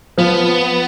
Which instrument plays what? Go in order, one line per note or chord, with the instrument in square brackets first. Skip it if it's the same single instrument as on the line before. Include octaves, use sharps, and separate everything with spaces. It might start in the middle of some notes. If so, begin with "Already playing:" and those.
[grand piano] F3 [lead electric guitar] B3